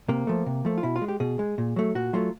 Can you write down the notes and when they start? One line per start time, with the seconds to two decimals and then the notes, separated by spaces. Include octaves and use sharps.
0.09 C3 A#3
0.27 F3 A3
0.46 C3
0.65 F3 A3
0.78 F4
0.83 B2 E4
0.96 F4
1.02 G#3
1.08 G4
1.20 B2 G#4
1.39 G#3
1.58 A#2
1.76 F#3 A3
1.95 A#2 F#4
2.13 F#3 A3 F4